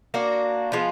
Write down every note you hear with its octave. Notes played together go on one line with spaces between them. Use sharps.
A#3 D4 F#4
F3 G#3 B3 F4